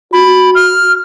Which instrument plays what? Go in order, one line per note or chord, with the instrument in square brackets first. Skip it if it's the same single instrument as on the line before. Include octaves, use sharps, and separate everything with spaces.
[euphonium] F#4 [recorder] B5
[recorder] F6